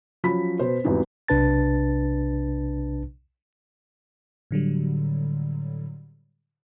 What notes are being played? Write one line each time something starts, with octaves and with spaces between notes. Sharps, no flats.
F3 F#3 C#4 B5 B6
B2 B3 C5
G#1 E2 G3 B3 D#4 F#4
B1 C3 D4 B4 A5 A6
A2 D3 F#3 G3